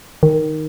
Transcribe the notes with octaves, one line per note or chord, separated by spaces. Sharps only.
D#3